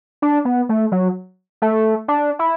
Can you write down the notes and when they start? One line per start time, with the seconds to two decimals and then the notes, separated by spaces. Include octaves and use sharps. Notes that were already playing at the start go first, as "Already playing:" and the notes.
0.22 D4
0.45 B3
0.69 A3
0.92 F#3
1.62 A3
2.08 D4
2.39 E4